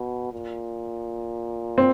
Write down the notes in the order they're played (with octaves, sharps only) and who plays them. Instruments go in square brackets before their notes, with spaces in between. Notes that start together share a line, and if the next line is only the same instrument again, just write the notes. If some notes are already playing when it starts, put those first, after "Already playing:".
Already playing: [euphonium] B2
A#2
[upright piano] C4